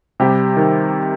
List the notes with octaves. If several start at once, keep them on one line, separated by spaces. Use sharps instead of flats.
C3 G3 G4
D#3